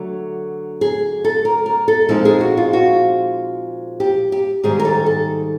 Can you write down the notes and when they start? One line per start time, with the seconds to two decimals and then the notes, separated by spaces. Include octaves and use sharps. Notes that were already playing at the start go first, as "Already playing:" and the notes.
Already playing: D3 F#3 A3
0.81 G#4
1.25 A4
1.45 A#4
1.66 A#4
1.88 A4
2.09 A#2 F3 G#3 C4 D#4 A4
2.25 G#4
2.41 F#4
2.57 F4
2.73 F#4
4.00 G4
4.32 G4
4.63 G#2 D#3 G3 G#4
4.79 A#4
4.85 A4
5.06 A4